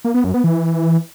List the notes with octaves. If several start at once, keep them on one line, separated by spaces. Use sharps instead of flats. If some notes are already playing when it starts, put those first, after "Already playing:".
A#3
B3
F#2
B3
E3